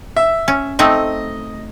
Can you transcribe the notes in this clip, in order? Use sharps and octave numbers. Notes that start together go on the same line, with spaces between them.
E5
C#4
A3 C4 D#4 D#5